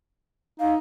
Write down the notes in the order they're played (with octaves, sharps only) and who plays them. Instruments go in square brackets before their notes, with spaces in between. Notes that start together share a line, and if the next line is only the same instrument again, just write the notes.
[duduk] D#4 [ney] F5